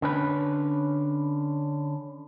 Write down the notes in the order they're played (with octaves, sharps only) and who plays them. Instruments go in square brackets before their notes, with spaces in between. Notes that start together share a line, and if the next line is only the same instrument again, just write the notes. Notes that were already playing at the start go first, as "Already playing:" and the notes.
[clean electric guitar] D3 C#4 B4